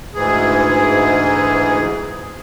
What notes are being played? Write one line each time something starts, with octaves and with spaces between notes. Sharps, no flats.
D2 G#2 E3 G#4